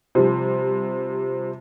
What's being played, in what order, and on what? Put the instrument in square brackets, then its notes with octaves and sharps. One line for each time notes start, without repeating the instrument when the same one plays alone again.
[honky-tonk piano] C3 F3 G3